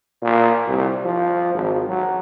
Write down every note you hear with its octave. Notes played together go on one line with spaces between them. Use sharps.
A#2
C2
F3
G#1
F#3